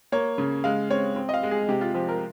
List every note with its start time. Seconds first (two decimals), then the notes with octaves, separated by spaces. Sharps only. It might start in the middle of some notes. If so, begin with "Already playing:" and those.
0.12 A#3 C#5
0.38 C#3
0.64 G#3 F5
0.90 C4 C#5
1.16 C4
1.29 D#5
1.34 F5
1.43 G#3
1.51 G#4
1.69 C3 G4
1.81 F4
1.94 F3 G4
2.08 A#4